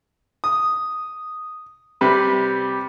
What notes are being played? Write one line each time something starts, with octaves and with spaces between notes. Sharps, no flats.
D#6
C3 G3 B4